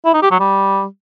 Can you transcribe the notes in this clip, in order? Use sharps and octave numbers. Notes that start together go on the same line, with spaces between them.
E4
D#4
G4
F#3
G3